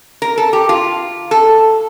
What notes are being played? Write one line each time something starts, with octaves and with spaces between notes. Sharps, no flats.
A#4
A4
G4
F4
A4